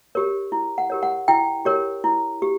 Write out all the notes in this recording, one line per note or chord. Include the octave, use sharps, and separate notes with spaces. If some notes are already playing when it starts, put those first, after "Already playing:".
G4 A#4 C#5
E4
F#5
G4 A#4 C#5
F#5
E4 G5
G4 A#4 C#5
E4
G4